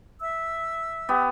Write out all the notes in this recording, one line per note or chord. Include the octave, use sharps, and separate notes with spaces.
E5 E6
B3 G4